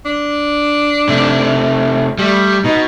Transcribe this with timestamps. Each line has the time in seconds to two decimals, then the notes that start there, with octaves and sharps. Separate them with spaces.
0.05 D4
1.09 C3 A3
2.18 G3 A3
2.64 B2 D#4